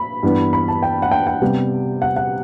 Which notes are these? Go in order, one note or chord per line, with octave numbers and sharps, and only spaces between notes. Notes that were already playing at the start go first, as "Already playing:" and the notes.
Already playing: B5
G2 E3 B3
B5
A5
G5
F#5
G5
G5
C3 G3 B3
F#5
F#5